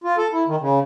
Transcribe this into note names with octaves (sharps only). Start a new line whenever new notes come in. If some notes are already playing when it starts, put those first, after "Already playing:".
F4
A4
E4
D#3
C#3